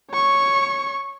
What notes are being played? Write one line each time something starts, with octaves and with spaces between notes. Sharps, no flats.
C#5 C#6